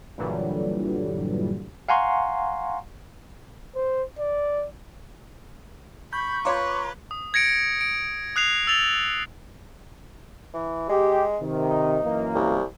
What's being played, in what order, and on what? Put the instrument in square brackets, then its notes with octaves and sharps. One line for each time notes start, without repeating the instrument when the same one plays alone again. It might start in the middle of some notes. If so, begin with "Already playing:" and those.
[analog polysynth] G2 A#2 D3 E3 F#3 G3
[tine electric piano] F5 F#5 G#5 A#5 C6 C#6
[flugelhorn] C5
D5
[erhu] B5 [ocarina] C#6 [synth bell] G6
[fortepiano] F4 C#5 [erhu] B4 [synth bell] A#5 C6 D6
[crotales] D#6
G#6 A#6 C#7 D7
D7
D#6 F#6 C7 F7
E6 A6 F7 G7
[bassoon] E3
[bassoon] G#3 [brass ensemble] G4
[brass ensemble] C3 D#3
[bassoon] D#4
[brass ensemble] F#2 E3 A#3
[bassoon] C2